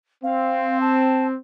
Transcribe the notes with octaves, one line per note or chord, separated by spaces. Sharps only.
C4 F5
A5